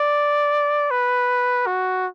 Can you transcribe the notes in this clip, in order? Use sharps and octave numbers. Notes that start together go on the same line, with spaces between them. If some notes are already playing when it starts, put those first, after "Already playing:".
Already playing: D5
B4
F#4